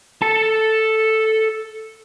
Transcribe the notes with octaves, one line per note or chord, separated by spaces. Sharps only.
A4 A5